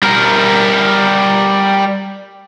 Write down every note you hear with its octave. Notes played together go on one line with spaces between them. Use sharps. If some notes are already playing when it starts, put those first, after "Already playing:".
G3 A#4